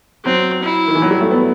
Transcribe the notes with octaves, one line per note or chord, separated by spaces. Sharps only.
F#3 C4
E4
D#3
E3
F#3
G3
A3
B3